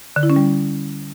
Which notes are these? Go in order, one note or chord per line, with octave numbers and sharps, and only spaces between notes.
D3
E4
C#4
G3